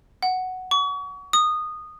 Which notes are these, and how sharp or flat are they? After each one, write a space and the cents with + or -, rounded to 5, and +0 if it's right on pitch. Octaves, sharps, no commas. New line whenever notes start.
F#5 +5
C#6 +35
D#6 -15